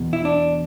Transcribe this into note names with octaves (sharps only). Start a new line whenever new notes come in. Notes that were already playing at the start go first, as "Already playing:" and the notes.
Already playing: E2 B2
E4
D4